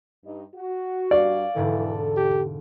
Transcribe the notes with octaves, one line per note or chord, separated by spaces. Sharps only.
G2 D#4
F#4
G2 C#5 D5 F5
E1 G#2 D3 E3 A4
G4